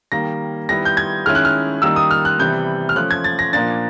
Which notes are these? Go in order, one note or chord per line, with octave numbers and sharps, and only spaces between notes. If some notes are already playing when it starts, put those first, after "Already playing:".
D#3 G3 A#3 A#6
D#3 G3 B3 E4 A#6
G6
G#6
D#3 G#3 C#4 E4 F6
F#6
F6
D#3 G3 A#3 D#4 E6
D#6
F6
F#6
C3 E3 G3 B3 G6
F6
F3 A3 C#4 F#6
G#6
A6
A#6
A#2 F3 A#3 D4 A6